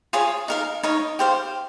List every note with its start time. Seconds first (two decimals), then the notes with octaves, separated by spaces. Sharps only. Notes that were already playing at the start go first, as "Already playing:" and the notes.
0.13 F4 G#4 C#5
0.48 D#4 A#4 F5
0.83 D#4 A#4 C#5
1.19 G4 C5 F5